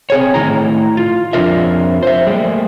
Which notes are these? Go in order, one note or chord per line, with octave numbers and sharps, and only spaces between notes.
C4 G#4 C#5
A2 D#3 C#4 E4 A#5
F4
F2 G3 D4 F4 A#4 E5
C5 E5
G3 A3 A#3 G#4